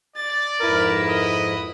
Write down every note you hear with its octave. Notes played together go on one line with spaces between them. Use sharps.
D5 A6
F2 G#2 E4 A#4 B4
D#5